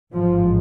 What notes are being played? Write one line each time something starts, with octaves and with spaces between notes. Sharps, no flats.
A1 G#2 F3